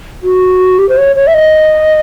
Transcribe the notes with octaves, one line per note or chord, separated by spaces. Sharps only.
F#4
G4
C5
C#5
C#5
E5
D#5